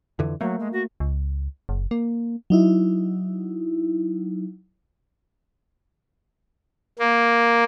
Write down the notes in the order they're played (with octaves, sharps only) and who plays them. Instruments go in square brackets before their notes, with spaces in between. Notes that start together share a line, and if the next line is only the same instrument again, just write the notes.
[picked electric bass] F2 D3 E3
[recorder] F#3 [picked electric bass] A3 A#3
[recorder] G#3
F#4
[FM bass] C#2
F#1
A#3
[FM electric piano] F#3 D#4 E4
[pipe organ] A#3